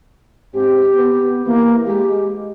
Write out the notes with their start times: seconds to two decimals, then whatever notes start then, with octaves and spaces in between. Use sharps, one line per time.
0.54 G#2 C4 G4
0.94 B3
1.46 E3 A#3
1.86 G#3 G4